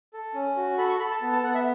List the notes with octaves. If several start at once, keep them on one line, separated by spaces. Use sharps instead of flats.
A4
C#4
F#4
A4 B5
C#6
A4 B5
A5
B3
A5
B3 F#5
E5